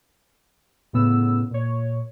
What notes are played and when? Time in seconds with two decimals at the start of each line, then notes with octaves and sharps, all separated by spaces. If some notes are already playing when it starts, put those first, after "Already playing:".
0.93 A2 C#3 B3 E6
1.51 A#2 C#5